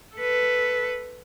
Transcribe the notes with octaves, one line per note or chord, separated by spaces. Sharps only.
A4 B4